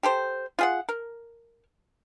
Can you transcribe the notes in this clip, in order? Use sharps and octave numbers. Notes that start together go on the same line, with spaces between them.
G4 A4 C5
F4 G#4 F#5
A#4